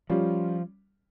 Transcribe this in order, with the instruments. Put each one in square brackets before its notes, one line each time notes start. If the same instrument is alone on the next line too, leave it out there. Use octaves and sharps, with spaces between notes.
[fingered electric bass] F3 [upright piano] G3 C#4 F4